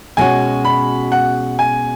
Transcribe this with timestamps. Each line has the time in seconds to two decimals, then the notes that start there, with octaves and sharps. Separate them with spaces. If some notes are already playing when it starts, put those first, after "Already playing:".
0.17 B2 G#3 C#4 F#4 G#5
0.65 B5
1.12 F#5
1.59 G#5